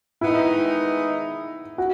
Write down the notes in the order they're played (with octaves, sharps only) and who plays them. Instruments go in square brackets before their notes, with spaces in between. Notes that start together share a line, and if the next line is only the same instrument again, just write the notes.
[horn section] D#3 G#3 B3 D#4 [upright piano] E4
[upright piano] F#4